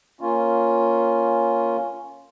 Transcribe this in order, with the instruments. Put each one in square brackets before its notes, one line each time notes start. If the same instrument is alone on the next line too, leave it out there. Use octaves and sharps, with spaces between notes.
[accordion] A#3 C#4 F4